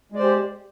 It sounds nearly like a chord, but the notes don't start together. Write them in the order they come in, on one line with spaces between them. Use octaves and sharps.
G#3 D5 C5 G4